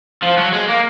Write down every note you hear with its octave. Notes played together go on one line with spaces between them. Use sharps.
F3
F#3
G#3
A#3